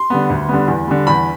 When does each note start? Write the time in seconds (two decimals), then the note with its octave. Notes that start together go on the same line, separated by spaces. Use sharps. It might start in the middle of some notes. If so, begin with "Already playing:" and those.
Already playing: C6
0.10 D3 G3 B3
0.30 D2
0.49 D3 G3 B3
0.68 E2
0.88 D3 G3
1.07 E2 B5